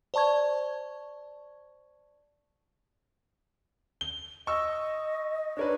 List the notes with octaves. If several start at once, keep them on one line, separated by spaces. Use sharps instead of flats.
C5 D5 A5 C#6 G#6
G7
D#5 C#6 E6
D4 A#4 B4 C#5